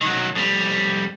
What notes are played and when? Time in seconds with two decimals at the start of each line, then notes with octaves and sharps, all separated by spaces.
0.01 D#3 F#3
0.35 F2 G3